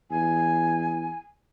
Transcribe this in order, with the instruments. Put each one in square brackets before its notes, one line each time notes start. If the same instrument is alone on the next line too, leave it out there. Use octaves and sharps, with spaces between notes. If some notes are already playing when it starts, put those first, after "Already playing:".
[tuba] E2 [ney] G#5